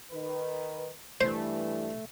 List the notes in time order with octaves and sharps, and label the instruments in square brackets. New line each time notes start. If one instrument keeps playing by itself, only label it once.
[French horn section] D#3 B4
[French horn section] G2 E3 [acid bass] A3 [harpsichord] C5